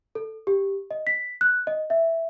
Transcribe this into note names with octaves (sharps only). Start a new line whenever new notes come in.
A4
G4
D#5
B6
F#6
D#5
E5